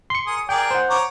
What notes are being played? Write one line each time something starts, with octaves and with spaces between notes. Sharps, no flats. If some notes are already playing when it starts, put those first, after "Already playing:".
C6 C#7
G#4 A#4 D#6
G#4 A#4 D5 G5
C5 F#5
C#5 A#5 D6